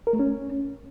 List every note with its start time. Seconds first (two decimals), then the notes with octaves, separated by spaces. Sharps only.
0.07 A#4
0.13 A3
0.19 C#4